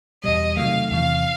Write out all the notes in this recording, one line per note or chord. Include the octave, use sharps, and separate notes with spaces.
E2 B2 G3 D#5
C3 D#3 F#3 A3 F5
E2 C3 E3 F5